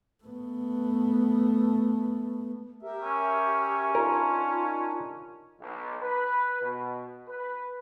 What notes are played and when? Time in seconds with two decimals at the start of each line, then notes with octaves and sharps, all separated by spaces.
0.24 A3 B3
2.83 G4 A#4 E5
3.03 C#4
3.95 D4 D#4 F4 A#4
5.60 B1
6.02 B4
6.62 B2
7.28 B4